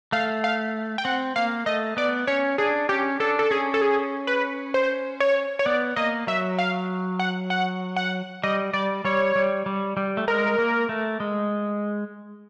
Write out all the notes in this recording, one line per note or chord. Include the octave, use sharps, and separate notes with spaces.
A3 F5
F5
G5
C4 F#5
A#3 F5
A3 D#5
B3 D5
C#4 C#5
D4 G#4
C#4 G4
D4 A4
A4
C#4 G#4
A4
G#4
B4
C5
C#5
C#5
B3 D5
A#3 D#5
F#3 E5
F5
F#5
F#5
F#5
G3 D#5
G3 D5
G3 C#5
G3
G3
G3
A3
G#3 A#4
A#3
A3
G#3